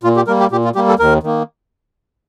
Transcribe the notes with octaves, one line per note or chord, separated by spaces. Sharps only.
A#2 F4
G4
G3 A#3 A#4
G4
A#2 G4
F4
G3 A#3 G4
A4
D#2 A#4
D#3 A#3